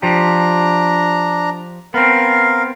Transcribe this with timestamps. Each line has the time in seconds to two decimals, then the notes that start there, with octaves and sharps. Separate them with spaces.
0.02 F3 D4 G4 A#5
1.94 B3 C4 A#4 F5